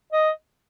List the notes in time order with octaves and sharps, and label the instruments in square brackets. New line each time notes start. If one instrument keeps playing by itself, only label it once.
[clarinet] D#5